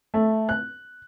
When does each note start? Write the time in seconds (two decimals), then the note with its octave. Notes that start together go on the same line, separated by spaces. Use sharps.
0.14 A3
0.49 F#6